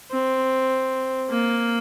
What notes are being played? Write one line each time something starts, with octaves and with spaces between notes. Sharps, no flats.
C4
A#3